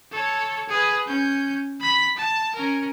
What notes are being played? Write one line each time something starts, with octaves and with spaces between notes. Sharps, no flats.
A4 C#5
G#4 B4
C#4 G6
B5 B6
A5
C#4 A#4